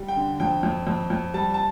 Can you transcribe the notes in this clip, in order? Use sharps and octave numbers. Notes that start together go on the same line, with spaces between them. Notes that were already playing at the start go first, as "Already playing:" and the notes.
Already playing: G3
G5
D3
F2 G5
F2
F2
F2
G3 A5
A5